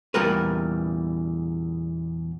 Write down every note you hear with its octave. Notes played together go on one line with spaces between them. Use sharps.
E2 A#2 G3 A#4 B4